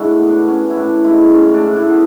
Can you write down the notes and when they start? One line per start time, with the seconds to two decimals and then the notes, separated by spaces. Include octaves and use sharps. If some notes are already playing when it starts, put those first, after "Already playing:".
Already playing: A2 G#3 D4 E4 F#4
0.19 B3
0.27 D4
0.48 B3 C#4
0.70 E4
0.77 A2 D4
1.04 G#3 E4
1.33 A2 C#4
1.54 D4
1.62 A2
1.76 E4
1.90 B3